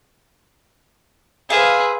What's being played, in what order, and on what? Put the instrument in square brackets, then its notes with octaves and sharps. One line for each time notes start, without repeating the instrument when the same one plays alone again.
[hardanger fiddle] G#4 B4 [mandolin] C5 E5 F5